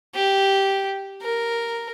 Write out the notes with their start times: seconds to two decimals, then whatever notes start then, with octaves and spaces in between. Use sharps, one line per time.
0.15 G4
1.22 A#4